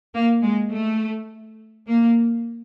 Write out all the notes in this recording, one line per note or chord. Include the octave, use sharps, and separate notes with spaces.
A#3
G#3
A3
A#3